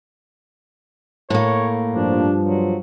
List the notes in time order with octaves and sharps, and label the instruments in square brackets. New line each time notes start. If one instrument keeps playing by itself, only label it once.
[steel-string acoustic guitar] A2 A#3 [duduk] C#5
[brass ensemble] G2 F3 [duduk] D4
[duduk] F#3